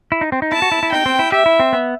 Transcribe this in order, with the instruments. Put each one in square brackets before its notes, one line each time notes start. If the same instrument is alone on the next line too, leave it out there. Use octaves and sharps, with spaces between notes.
[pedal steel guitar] E4
D#4
C4
D#4
[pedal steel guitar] E4 [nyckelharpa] A5
[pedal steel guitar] F#4
E4
E4
[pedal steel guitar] D#4 [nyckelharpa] G5
[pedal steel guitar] C4
E4
[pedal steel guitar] G4 [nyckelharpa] E5
[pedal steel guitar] E4
C4
B3